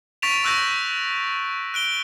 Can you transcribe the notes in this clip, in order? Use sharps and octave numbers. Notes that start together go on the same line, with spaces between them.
C#6 A6 B6 D7 E7 F7
C#6 E6 F#6 G6 A#6
F#6 D7 G7